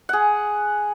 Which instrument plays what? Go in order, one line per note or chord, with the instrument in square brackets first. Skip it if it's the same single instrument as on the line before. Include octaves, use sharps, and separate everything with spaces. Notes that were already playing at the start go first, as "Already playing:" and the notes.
[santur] G#4 F#5